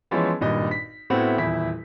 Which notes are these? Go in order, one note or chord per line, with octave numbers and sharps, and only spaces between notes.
E3 F3 G#3 B3 C#4
G#1 G2 A#2 D#5
B6
A2 A3 B3 C4 E4 F#4
D#1 E2 E4 B6